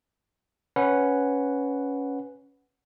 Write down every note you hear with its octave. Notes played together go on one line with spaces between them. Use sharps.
C#4 B4 F#5